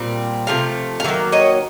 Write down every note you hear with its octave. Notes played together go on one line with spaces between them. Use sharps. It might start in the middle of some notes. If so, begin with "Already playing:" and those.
Already playing: A#2 G3 C4
C3 F3 A3 F5
F5
D#3 F#3 A#3 E5
C#5 D#5